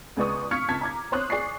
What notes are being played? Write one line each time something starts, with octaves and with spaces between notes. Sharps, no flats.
C#2 G#3 B3 D5 C#6 D#6
F5 C#6 F6 G#6 B6 C#7
C#2 A5 G#6 B6
A#5 D6 G#6
C5 C#5 C6 D#6 F#6
G#4 D5 C#6 C7